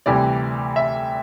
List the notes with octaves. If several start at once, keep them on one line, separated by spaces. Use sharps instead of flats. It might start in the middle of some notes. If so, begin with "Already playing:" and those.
D2 C3 E3 G3 D5
E5